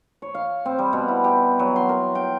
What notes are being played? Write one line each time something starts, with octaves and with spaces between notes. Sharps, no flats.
C#5
F5
C4
G3
B2
E4
G4
F#3
C6
A#4
G5